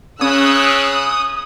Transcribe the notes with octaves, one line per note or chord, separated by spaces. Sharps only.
C#3 C#4 C#5 D#6 E6 F#6